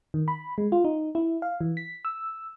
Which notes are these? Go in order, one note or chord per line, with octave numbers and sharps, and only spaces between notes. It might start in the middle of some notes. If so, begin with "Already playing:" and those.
D#3
B5
G#3
F4
D#4
E4
F5
E3
B6
E6